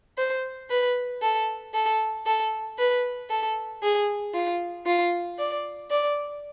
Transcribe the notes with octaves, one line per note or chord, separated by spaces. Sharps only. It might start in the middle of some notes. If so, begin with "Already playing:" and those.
C5
B4
A4
A4
A4
B4
A4
G#4
F4
F4
D5
D5